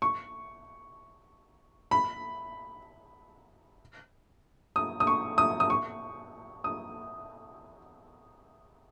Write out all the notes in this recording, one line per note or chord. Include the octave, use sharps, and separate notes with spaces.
C#6
B5
D#6
D#6
C#6
D#6
D#6
C#6
D#6